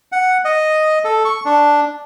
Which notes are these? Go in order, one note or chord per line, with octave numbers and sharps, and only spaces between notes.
F#5
D#5
A4
C#6
D4